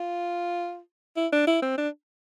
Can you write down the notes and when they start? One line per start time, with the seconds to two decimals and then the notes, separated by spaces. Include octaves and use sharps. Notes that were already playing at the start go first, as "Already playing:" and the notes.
Already playing: F4
1.17 E4
1.32 D4
1.48 E4
1.62 C4
1.78 D4